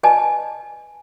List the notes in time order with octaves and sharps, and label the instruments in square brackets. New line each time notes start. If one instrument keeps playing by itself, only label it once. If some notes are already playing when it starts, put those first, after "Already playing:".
[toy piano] B4 D5 D#5 G#5 A5